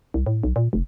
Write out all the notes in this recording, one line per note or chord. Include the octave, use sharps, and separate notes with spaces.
C2
A2
B1
A#2
F1